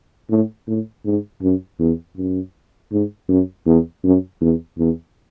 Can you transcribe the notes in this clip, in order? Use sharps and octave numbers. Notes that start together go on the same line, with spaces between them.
A2
A2
G#2
F#2
E2
F#2
G#2
F#2
E2
F#2
E2
E2